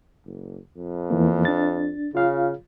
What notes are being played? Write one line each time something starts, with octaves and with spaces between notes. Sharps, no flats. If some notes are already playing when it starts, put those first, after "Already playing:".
F#1
F2
E2 E3 A#3
D4 A6
C#3 F4 F5